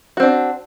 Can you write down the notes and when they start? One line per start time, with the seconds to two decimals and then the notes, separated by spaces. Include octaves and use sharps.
0.17 F#4
0.20 C4
0.22 D4